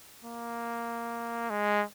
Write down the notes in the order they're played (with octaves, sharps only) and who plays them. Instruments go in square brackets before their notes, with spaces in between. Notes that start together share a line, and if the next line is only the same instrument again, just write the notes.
[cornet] A#3
G#3